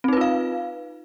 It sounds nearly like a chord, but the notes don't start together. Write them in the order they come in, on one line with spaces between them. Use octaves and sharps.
C4 D#4 B4 F4 F5